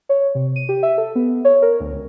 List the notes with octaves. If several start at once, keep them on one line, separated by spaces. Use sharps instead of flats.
C#5
C3
D#7
G4
E5
A4
B3
C#5
A#4
D2
C#2